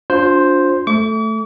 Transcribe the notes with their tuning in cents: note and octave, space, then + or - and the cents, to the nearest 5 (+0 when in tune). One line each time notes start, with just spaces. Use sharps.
D4 -20 F4 +35 C5 +0
A3 +0 D6 -45